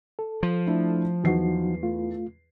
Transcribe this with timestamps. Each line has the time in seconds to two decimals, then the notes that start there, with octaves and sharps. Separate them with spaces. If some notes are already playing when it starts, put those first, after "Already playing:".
0.19 A4
0.43 F3
0.67 A3 D4 E4
1.24 E2 F#3 D#4 F#4 C7
1.83 A3 F4